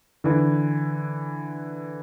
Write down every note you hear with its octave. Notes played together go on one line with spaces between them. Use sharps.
D3 E3